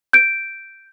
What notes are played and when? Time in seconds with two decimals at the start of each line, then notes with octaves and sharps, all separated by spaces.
0.13 G6 D7